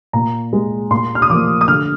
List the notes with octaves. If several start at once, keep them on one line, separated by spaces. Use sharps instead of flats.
A#2 A#5
G#3
A#2 C6
F6
D#6
F3 A#3 D6
D#6
D3 F6